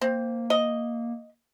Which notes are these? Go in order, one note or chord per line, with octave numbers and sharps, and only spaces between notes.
A#3 C4
D#5